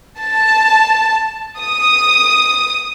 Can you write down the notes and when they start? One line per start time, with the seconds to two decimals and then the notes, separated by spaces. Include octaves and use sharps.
0.18 A5
1.62 D#6